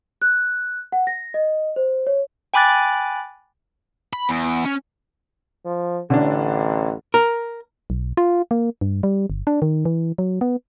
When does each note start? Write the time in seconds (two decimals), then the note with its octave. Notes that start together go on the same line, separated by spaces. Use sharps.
0.22 F#6
0.92 F#5
1.07 A#6
1.34 D#5
1.76 C5
2.07 C#5
2.54 G5 G#5 B5 D6 F#6 A6
4.13 B5
4.29 E2
4.65 C#4
5.65 F3
6.10 A1 D3 C#4 D4
7.14 A#4
7.90 B1
8.17 F4
8.51 A#3
8.81 G2
9.03 G3
9.30 G1
9.47 D4
9.62 D#3
9.85 E3
10.18 F#3
10.41 B3